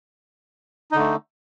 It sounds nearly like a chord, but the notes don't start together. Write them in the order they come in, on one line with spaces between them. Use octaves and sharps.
D#4 D3 A3